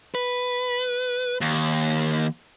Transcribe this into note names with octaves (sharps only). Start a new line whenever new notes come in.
B4
D#2